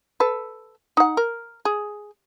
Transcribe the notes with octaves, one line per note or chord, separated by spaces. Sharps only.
A4 B4
D#4 F#5
A#4
G#4